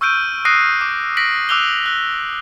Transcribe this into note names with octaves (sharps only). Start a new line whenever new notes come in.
C#6 E6 F6 G6 D7 D#7
D#6 F#6 A#6 C7 D7 D#7
D6
A#6 B6 D7 F#7
D6 E6 F#6 F7 G7
F#6